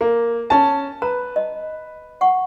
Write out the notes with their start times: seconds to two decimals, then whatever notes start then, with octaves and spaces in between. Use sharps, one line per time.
0.01 A#3
0.50 C#4 A5
1.02 B4 A#5
1.36 D#5
2.21 F#5 C#6